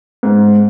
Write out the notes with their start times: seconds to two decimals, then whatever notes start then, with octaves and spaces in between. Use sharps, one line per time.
0.23 G#2